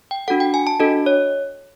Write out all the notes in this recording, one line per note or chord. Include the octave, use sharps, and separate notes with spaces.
G5
D4 F#4 A4 F#5
G5
G#5
A5
D4 F#4 A4 D#5
C#5